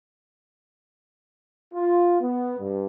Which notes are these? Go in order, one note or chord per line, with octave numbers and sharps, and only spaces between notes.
F4
B3
G2